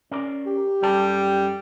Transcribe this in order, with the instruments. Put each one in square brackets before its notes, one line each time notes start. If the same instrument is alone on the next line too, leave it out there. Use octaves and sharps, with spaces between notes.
[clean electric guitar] C#4 A#4 D5
[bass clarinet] G4
[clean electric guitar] F#2 A4 A5 [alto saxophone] G3 [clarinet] G5